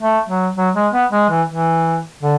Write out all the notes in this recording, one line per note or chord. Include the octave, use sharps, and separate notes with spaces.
A3
F#3
F#3
G#3
B3
G#3
E3
E3
D3